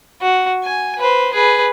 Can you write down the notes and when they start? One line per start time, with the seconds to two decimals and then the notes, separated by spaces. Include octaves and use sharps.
0.22 F#4
0.64 G#5
0.99 B4 C5
1.34 G#4 B4